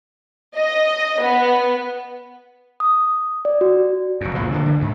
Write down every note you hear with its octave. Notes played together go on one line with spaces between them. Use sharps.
D#5
B3
D#6
D5
F#4
F1 F#2
C#2 A#2 C#3 F3
D3 D#3 F3 A#3
D3 E3
D2 G#2